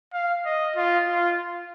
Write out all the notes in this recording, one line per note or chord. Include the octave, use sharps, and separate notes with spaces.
F5
D#5
F4
F4